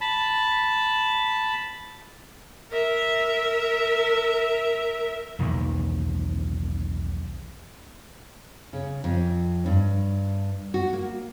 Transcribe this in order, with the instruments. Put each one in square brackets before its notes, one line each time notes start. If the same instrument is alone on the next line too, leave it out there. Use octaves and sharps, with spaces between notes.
[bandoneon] A5 B5
[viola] A#4 E5
[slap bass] B1 E2 A#2 D#3
[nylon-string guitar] C#3
F2
G2
F#4
A#3